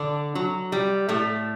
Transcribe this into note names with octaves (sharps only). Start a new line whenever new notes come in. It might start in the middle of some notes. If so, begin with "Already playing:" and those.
Already playing: D3 D4
F#3
G3
A2 A3